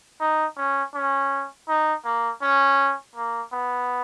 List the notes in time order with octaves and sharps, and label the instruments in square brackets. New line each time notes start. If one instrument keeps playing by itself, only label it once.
[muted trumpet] D#4
C#4
C#4
D#4
A#3
C#4
A#3
B3